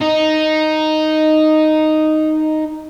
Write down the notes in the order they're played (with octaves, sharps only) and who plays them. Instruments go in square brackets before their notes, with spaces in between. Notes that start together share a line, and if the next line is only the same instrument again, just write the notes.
[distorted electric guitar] D#4